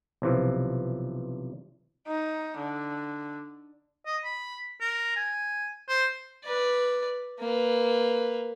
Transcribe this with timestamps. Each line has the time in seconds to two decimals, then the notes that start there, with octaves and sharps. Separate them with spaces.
0.22 B1 C3 E3 F3
2.08 D#4
2.58 D3
4.06 D#5
4.24 B5
4.81 A#4
5.16 G#5
5.89 C5
6.45 B4 D5
7.39 A#3 B4